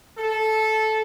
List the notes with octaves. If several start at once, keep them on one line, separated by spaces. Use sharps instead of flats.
A4